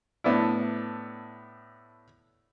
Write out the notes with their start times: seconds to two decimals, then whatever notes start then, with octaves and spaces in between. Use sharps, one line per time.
0.24 A2 B3 D4 E4